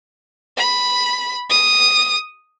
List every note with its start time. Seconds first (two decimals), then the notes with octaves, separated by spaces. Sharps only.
0.57 B5
1.50 D#6